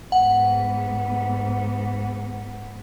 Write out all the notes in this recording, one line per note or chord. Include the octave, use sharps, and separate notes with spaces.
G#2 B3 F#5